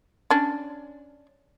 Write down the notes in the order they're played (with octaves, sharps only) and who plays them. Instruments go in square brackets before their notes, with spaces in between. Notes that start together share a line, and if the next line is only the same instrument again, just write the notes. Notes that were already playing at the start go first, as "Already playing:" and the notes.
[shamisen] C#4 D4